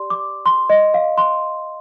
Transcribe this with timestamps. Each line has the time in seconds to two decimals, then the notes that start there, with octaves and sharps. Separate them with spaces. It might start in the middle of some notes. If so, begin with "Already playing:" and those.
Already playing: G4 D5 C6
0.10 D6
0.46 C6
0.70 D#5
0.94 F5
1.18 C6